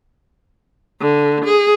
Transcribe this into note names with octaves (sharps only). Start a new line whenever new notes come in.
D3
G#4